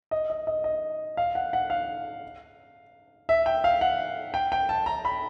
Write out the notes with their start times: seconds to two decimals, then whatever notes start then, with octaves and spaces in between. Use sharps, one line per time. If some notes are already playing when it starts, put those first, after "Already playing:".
0.11 D#5
0.30 D#5
0.47 D#5
0.64 D#5
1.17 F5
1.35 F#5
1.53 F#5
1.70 F5
3.29 E5
3.46 G5
3.64 F5
3.81 F#5
4.34 G5
4.52 G5
4.69 A5
4.86 A#5
5.05 B5